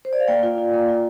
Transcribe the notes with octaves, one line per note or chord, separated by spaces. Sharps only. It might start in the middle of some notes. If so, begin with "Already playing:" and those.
C5
D5
F5
A#3 D5 G5
F4
F4
A#3
F4